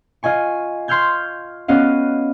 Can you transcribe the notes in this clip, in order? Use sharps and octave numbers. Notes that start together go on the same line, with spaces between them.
F4 D#5 G#5 C#6
C6 C#6 F6 G6 G#6
B3 C#4 F#4 D#5 F5